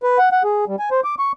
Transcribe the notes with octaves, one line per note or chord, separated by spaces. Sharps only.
B4
F#5
F#5
G#4
G3
G#5
C5
D6
C#6